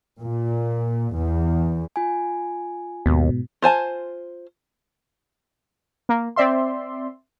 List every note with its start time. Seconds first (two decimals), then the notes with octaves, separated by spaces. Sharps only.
0.21 A#2
1.15 E2
1.96 F4 G#5
3.06 D#2 G#2 B2
3.62 F4 C5 G#5 A5
6.09 A#3
6.36 C4 D5 E5 C6